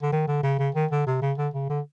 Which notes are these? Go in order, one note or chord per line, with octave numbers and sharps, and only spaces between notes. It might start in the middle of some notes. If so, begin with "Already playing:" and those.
D3
D#3
D3
C#3
C#3
D#3
D3
C3
C#3
D3
C#3
D3